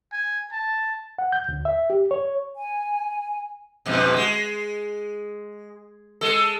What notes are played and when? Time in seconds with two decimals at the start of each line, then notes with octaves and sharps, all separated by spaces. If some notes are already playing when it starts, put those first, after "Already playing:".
0.12 G#5
0.52 A5
1.19 F#5
1.32 G6
1.49 D2
1.65 E5
1.90 G4
2.11 C#5
2.56 G#5
3.86 F2 G#2 B2
4.16 G#3
6.21 G#3 A4